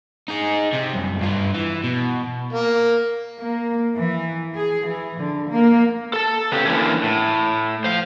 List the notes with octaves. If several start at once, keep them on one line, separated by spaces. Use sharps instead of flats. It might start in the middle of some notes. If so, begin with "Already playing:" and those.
D#4 G#4
C3
C2 F#2
G2 F4
E3
B2
A#3
A#3
E3
G#4
E3
D3
A#3
A4 A5
C#3 B3 G4
D3 E3 F3 A#3 C#4
A2
C5 F5